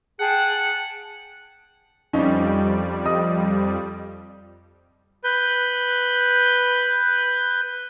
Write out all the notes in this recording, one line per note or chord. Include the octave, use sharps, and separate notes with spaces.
G#4 F#5 G5 A5
F2 G3 C#4 D#4
D#5 D#6
B4 G6